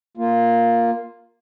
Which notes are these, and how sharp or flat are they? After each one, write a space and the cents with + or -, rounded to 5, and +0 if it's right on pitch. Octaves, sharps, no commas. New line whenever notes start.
A#3 +0 F4 +0